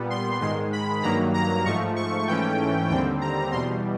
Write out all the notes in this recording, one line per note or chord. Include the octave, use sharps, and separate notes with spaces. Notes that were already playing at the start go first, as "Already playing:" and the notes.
Already playing: A#2 G3 B3
C6
G#2 D#3 G#3 C6
B5
G2 D#3 F#3 A#3 A#5
A#5
G#2 F3 A3 C#6
C#6
G#2 E3 A3 C#4 G5
D#2 D3 G3 C4 G5
A#5
E2 B2 G3 C6